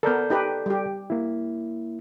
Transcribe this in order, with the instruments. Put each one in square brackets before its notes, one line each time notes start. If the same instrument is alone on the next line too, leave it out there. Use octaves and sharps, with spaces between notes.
[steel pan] B3 A#4 [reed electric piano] A4 D5 G6
[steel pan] D#4 G4 B4
G3 G4
[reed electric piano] A#3 E4